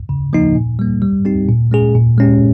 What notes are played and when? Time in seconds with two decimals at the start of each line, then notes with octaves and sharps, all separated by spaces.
0.09 C#3
0.33 F3 A#3 D#4
0.55 A#2
0.79 G3 A#3
1.02 G3
1.25 C4 D#4 G4
1.48 A#2
1.71 G#3 C#4 G#4
1.95 A#2
2.18 G#3 C#4 G4